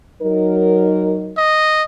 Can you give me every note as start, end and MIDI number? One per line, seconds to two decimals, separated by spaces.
0.22 1.35 54
0.22 1.35 63
0.22 1.35 70
1.37 1.83 75